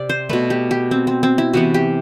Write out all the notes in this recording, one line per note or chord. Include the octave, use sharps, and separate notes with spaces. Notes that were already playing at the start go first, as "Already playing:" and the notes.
Already playing: C3 D5
C5
B2 A3 B4
G4
G4
C4
C4
C4
E4
C3 E3 B3 F#4
G4